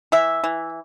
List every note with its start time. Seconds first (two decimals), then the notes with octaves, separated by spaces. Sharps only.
0.12 E3 E5
0.44 E3